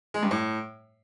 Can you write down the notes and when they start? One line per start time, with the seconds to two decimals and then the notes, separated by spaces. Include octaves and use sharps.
0.14 G#3
0.23 G2
0.31 A2